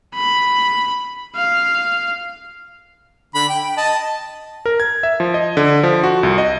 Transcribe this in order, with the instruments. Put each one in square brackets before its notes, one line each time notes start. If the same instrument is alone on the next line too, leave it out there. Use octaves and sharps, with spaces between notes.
[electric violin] B5
F5
[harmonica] D3 B5
G5
G5
D#5 A5
[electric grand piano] A#4
G#6
E5
F3
D#5
D3
F3
F#4
C2
D#5